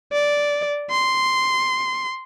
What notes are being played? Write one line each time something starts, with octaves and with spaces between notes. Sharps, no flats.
D5
C6